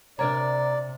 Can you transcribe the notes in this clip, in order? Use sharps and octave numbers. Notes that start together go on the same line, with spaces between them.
C3 D4 A#4 C#5 D5 A#5